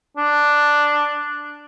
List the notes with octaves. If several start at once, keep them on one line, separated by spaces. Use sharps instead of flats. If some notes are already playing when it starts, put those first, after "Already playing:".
D4